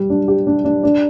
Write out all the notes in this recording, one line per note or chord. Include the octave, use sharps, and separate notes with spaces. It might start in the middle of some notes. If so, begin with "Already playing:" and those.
Already playing: G3 G4
D4
G4
D4
D4
D4